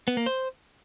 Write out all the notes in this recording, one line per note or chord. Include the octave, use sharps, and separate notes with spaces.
B3
A#3
C5